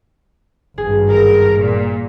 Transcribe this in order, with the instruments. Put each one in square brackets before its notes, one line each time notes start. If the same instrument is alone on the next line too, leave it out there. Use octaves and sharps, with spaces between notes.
[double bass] G#1 G2 [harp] G#4
[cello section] A#4
A#2